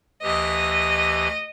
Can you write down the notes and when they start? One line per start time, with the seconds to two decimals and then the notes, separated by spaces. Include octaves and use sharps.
0.23 D2 E3 G4 D#5